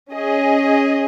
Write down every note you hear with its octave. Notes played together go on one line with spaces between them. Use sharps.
C#4 G#4 D#5 G#5